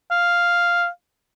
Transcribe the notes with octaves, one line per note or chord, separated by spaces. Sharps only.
F5